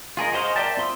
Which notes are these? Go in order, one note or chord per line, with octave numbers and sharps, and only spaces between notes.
F4 G#4 A#4 D#5
F#4 G#4 C5 D#5 F5
A#4 D5 E5 G5 A5
C4 F4 C6 D#6 E6